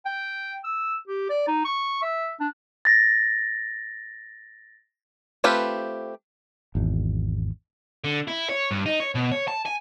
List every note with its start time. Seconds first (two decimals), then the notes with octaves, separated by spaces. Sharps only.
0.06 G5
0.64 E6
1.08 G4
1.30 D5
1.48 D#4
1.65 C#6
2.03 E5
2.40 D4
2.85 A6 A#6
5.44 A3 C4 F4 G4 B4
6.75 G#1 E2
8.04 D3
8.28 E4
8.50 C#5
8.71 G2
8.86 D#4
9.00 C#5
9.15 B2
9.32 C#5
9.48 A5
9.66 G#5